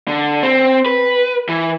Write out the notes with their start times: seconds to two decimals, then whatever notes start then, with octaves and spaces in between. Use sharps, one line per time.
0.08 D3
0.43 C4
0.86 B4
1.49 E3